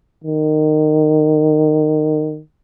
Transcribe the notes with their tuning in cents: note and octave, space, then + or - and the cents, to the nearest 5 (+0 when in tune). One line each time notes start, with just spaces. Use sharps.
D#3 -20